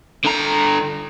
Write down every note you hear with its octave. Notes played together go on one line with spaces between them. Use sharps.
D3 A#5